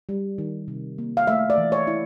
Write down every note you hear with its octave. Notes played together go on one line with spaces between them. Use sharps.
G3
D#3
C3
A#3
F5
A3 E5
D5
E3
C#5
E4